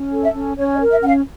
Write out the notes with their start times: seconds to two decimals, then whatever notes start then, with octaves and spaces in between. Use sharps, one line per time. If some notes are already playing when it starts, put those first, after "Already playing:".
Already playing: C#4
0.12 A4
0.23 E5
0.34 C#4
0.56 C#4 C#5
0.74 D5
0.79 A#4
0.90 E5
1.02 C#4 F#5
1.07 F5